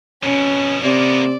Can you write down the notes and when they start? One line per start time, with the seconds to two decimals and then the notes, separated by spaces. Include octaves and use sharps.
0.23 F2 B2 C#4
0.84 C3 A#3 B3 D5